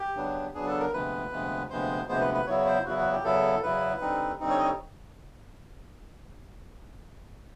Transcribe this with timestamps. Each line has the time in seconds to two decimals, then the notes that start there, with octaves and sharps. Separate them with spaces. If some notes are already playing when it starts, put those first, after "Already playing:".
Already playing: G4
0.16 C#3 F#3 B3 D4
0.55 C#3 F#3 B3 D4 G#4
0.67 A4
0.79 A#4
0.93 D2 C3 F3 G#3 B3 B4
1.32 D2 C3 F3 G#3 B3
1.70 D2 C3 F3 G#3 B3 C5
2.09 D2 C3 F3 G#3 B3 C5
2.21 B4
2.34 B4
2.47 E2 C#3 F#3 B3 E4 C#5
2.66 C5
2.85 E2 C#3 F#3 B3 E4 F#4
2.98 F#4
3.12 G4
3.24 E2 C#3 F#3 B3 E4 A4
3.63 E2 C#3 F#3 B3 E4 B4
4.01 D3 G3 C4 D#4
4.40 D3 G3 C4 D#4
4.50 C#5
4.58 D#5
4.64 C#5